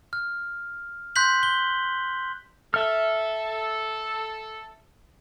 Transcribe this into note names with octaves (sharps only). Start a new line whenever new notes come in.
F6
C6 F#6 G6 B6 F#7
G7
A4 E5 F6